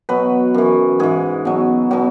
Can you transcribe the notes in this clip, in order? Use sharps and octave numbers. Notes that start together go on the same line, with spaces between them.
B2 F#3 B4
F#2 E3
G#2 E3 G#4
B2 F#3
B2 F#3